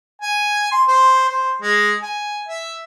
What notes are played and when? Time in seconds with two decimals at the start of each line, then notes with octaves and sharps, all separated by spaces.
0.22 G#5
0.72 C6
0.88 C5
1.29 C5
1.62 G#3
2.02 G#5
2.48 E5